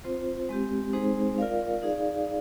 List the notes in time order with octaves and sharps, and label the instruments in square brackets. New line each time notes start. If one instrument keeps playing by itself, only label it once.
[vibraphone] C4 F4 C5
G#3 C4 G4
G#3 C4 D#4 G#4 C5
F4 A#4 D5 F5
D#4 G#4 D5 F5